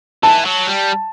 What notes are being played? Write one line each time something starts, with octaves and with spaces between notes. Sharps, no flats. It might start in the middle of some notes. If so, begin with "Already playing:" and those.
E3 A5
F#3
G3